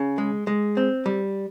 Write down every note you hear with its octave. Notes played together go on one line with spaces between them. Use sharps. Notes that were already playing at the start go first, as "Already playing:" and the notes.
Already playing: C#3
G#3
G#3
C4
G3